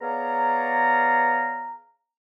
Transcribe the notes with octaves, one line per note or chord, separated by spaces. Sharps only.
B3 G#4 C#5 D5 F5 A#5